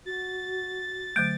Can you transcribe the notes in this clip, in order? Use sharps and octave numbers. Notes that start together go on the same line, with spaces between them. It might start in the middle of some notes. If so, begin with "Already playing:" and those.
F#4 A6
D3 F#3 A3 G6 D7